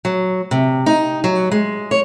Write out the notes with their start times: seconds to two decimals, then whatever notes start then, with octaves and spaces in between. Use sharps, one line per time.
0.05 F#3
0.51 C3
0.86 D#4
1.24 F#3
1.52 G#3
1.91 C#5